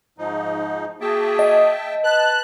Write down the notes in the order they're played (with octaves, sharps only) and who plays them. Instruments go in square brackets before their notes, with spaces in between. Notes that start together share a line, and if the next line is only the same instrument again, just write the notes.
[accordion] G#2 F3 D#4
[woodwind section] A#3 F#4 G#4 [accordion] E5 G5 A5
[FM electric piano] D#5
[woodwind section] B4 A5 [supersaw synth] F#6